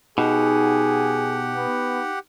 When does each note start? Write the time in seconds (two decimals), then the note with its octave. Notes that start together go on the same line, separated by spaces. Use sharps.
0.18 B2 D#4 G4 G#4 F#5
1.55 B3